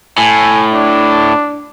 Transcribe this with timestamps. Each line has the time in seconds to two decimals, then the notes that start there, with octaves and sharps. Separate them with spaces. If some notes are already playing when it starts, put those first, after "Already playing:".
0.18 A2 G#5
0.73 D4